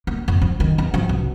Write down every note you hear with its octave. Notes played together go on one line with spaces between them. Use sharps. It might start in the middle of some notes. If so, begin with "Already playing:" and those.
A#3
F2
F3
D#3
E2
F3
B1